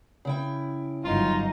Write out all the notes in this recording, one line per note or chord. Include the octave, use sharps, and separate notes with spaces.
C#3 E4 G5
G1 F#2 D#4 F4